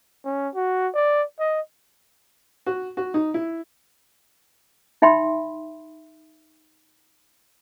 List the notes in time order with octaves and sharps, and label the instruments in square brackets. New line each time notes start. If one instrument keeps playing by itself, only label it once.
[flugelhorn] C#4
F#4
D5
D#5
[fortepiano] F#4
F#4
D#4
E4
[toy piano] D#4 E5 G5 B5 C6